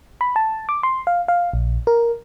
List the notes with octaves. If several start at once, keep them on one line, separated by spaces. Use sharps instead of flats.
B5
A5
D6
C6
F5
F5
A#1
A#4